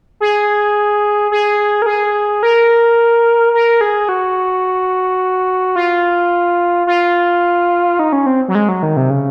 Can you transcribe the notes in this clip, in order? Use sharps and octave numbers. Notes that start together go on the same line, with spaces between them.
G#4
G#4
A#4
G#4
A#4
A#4
G#4
F#4
F4
F4
D#4
C#4
C4
F#3
G#3
F#3
D#3
C3
C#3